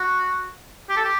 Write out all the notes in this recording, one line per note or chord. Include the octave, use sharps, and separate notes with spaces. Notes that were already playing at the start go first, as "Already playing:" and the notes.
Already playing: F#4
G4
A4
G4